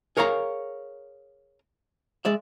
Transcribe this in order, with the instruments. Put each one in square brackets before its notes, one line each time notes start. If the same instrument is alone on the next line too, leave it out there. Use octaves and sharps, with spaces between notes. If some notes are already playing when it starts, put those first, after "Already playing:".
[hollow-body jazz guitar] G#4 A#4 C#5 F5 G#5 A#5
G#3 D5 E5